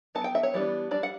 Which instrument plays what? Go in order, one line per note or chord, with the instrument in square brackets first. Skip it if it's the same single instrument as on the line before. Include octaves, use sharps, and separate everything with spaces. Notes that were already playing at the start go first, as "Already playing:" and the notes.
[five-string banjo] F#3 B3 A5
G5
E5
C#5
E3 G3 B3 D4
G3 D4 D5
F#5